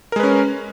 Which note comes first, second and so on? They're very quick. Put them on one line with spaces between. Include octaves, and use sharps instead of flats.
A#4 G#3 B4 C#4